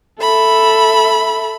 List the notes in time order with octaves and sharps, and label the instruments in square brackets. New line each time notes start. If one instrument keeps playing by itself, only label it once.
[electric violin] A4 E5 [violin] B5